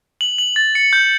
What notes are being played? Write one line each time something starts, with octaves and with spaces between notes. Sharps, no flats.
F#7
F#7
A6
C#7
G6